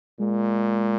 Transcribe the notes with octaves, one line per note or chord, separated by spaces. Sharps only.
A#2 G#3